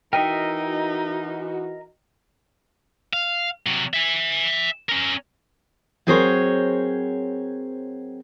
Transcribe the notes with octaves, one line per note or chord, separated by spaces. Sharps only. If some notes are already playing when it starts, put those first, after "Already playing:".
E3 D#4 F#4 A#4 D#5 E5 G5
F5
C3 F#3
E5 G#5
C#4 A#4
F#3 C4 G#4 A#4 C5 C#5